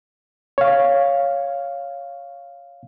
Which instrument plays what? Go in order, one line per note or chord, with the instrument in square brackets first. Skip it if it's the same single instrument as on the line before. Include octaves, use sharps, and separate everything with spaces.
[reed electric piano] C#5 F5